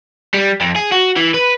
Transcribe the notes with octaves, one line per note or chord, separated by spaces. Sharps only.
G3
F2
G#4
F#4
E3
B4